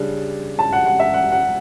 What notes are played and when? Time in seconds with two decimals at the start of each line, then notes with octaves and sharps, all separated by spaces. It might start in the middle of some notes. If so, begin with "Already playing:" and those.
Already playing: C#3 G3 D4
0.59 A5
0.73 F#5
0.86 F#5
1.00 E5
1.14 F#5
1.32 F#5